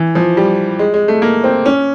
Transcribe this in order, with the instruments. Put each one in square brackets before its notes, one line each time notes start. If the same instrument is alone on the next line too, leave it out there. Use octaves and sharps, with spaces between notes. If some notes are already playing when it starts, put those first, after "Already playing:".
Already playing: [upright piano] E3
F3
G3
G#3
G#3
A3
A#3
C4
C#4